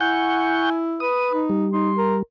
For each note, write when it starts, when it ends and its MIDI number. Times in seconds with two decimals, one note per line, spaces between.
0.01 1.06 64
0.01 0.70 78
0.01 0.77 80
0.01 0.70 85
0.01 0.70 91
1.00 1.46 71
1.00 1.32 87
1.33 1.67 63
1.50 2.23 55
1.73 1.90 63
1.73 2.15 84
1.97 2.18 70